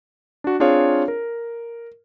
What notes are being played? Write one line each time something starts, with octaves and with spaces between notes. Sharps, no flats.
D4 F#4
C4 D4 F4 G#4 C#5 F5
A#4